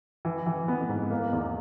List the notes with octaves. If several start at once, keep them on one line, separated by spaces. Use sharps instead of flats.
E3
E3
B3
G#2
A#3
E2